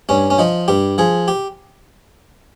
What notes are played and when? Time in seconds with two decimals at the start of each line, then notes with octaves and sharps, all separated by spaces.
0.09 G2 C#4
0.30 C#4
0.38 F3 D#4
0.68 G2 G4
0.98 F3 G#4
1.28 G4